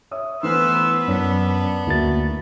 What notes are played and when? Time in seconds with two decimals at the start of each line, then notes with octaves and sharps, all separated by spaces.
0.11 C#5 E5 D#6
0.43 E3 A3 B3 B4 C5 E6 F6
1.08 F#2 D4 C#5 B6
1.47 D4
1.87 D2 A#3 E4 F#4 A6